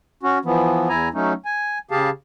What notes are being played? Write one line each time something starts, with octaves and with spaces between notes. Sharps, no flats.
C#4 F#4
E3 F3 B3
E2 E4 G#5 A#5
F#3 A3 C#4 D#4
G#5
C#3 G4 G#4 F5 A5